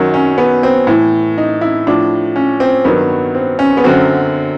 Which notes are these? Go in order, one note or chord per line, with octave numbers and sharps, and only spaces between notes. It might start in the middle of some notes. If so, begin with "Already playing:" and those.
Already playing: F#2 D#3 F#3
C#4
B3
C4
A2 E3
D#4
E4
A2 F3 D4
C#4
C4
G2 D#3 F#3 B3
C4
C#4
B3
F#2 D3 F#3 C4